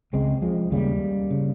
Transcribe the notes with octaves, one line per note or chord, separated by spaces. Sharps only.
C#2 C#3 G#3 C4
F3 G#3
D#2 C#3 G3 A#3
C#3